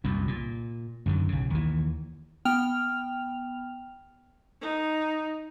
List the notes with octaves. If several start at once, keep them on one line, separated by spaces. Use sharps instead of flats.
C2 F#2 A#2
A#2
F#2 D3 D#3
B1 C#3
D#2 E3
B3 G5 F6 F7
D#4